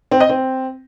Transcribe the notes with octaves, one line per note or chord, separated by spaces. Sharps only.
C4
D#5
C4